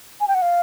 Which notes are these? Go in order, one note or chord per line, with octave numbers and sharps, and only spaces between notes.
G#5
G5
F#5
F5